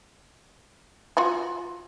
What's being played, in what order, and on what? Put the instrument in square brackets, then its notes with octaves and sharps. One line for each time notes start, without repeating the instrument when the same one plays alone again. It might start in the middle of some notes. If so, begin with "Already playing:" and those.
[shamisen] F4 F#4 G#5